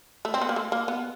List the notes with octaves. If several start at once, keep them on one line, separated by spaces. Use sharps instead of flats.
A3
C4
B3
A#3
A3
A#3
B3